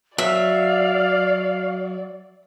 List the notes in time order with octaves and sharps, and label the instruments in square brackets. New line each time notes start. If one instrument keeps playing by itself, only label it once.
[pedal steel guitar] F#3 [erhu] D5 [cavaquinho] E5 [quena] F5